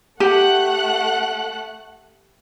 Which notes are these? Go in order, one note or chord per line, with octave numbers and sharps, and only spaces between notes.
A3 G4 F#5 F#6